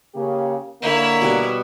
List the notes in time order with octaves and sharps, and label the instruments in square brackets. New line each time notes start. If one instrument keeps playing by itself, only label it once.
[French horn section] C#3 A#3 G4
[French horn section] D3 A#3 [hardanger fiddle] E4 C#5
[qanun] B2 G3 F#5